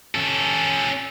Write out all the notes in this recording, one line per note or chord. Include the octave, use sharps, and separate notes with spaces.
C#4 A4